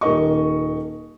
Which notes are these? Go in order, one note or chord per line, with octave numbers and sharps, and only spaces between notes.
D#1 D#4 A#4 D#5 C#6